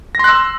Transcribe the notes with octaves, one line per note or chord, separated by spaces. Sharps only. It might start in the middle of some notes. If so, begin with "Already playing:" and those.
C6 E6 F#6 A#6